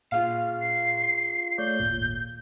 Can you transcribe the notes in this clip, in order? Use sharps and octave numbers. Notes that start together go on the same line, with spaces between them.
A#2 F4 G#4 F5 F6
C7
A3 C#5 D5 G6
G#1 D#2 A#2